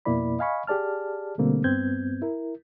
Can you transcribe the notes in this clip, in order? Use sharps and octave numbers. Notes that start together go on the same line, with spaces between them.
F2 B2 A#3 E4 D5 B5
D#5 F5 G#5 B5 C#6
G4 G#4 D5 A5 F6
B2 D3 G3 A3 A#3 C4
G2 B3 C4 G6 G#6
E4 A#4